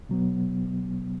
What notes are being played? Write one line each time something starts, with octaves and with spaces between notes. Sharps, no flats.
B2 F#3 B3